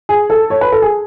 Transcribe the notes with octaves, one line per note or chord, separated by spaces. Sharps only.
G#4
A4
C#5
B4
A4
G#4